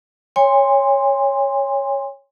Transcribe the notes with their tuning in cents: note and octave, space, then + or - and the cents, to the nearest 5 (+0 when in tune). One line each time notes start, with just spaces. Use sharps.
C#5 +0 G#5 -40 C6 +0